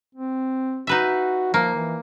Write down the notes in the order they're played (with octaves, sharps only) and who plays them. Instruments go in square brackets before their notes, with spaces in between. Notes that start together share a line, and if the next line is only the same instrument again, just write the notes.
[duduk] C4
[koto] D#4 B4 E5 [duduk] F#4
[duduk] F3 [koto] A#3
[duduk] E3